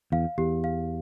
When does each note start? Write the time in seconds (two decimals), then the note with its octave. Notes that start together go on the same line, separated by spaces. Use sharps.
0.12 E2 F5
0.38 E2 G4
0.64 F5